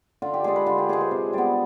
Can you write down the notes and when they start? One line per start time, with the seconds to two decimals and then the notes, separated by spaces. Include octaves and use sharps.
0.22 D3 F4
0.34 G4
0.44 G#3 D4 G#4
0.56 B4
0.66 D3 F4
0.78 G4
0.89 G#3 D4 G#4
1.01 C5
1.11 C3
1.33 G3 B3 D5